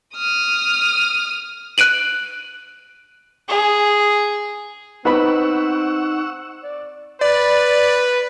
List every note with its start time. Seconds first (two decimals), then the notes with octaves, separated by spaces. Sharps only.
0.15 D#6 F6
1.78 F#6 D7 D#7 F#7
3.49 G#4
5.05 B3 C4 D#4 F#5 B5 C#6 E6
6.64 D5
7.21 B4 D5